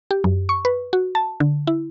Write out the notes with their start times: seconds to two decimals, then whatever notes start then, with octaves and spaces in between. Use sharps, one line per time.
0.11 G4
0.24 F#2
0.49 C#6
0.65 B4
0.93 F#4
1.15 A5
1.40 D3
1.67 E4